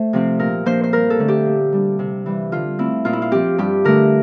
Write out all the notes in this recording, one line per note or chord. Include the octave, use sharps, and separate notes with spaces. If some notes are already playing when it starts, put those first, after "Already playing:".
Already playing: A3 C5
C3 F3 C4
A#2 A#4
F3 A#3 D4 C5
C5
G2 A#4
A4
D3 A3 C4
G4
A#2
G3 D4
C3
E3 G3
D3 F4
A3 C4 E4
A#2 F4
E4
F4
F3 C4 G4
G2 G4
D3 A3 A#4